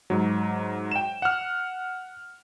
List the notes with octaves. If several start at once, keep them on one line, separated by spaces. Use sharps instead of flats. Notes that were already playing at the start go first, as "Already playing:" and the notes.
G#2 F#3
G5 E7
F#5 F6